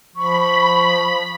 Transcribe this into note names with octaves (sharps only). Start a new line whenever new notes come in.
F3 B5 C#6